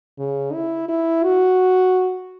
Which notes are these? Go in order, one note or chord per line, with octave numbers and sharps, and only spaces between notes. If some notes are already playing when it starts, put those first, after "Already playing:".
C#3
E4
E4
F#4